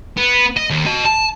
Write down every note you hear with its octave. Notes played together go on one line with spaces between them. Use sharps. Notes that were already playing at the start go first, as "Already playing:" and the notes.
B3
D#5
D#2
F#4 D#5
A5